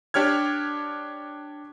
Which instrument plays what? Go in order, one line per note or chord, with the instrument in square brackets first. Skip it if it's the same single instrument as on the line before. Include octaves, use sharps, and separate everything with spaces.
[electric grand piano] D4 G4 C#5 F6 G#6